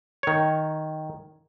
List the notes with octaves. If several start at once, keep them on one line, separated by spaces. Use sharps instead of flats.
D#3 C#5